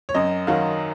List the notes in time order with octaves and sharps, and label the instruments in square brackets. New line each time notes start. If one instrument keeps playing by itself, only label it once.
[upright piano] C#5
F#2 D#5
D#3 F#3 F5